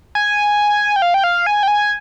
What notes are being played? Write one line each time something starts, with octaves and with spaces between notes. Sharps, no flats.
G#5
G5
F5
G5
F5
G#5
G5
G#5